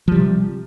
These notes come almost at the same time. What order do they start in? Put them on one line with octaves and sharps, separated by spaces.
F3 G3 C3